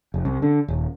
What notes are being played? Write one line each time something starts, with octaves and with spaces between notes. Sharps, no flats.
F1
C2
D3
D#1